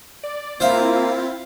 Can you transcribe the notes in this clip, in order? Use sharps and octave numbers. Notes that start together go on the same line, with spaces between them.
D5
A#3 C4 E4 F4 C5 E5 F5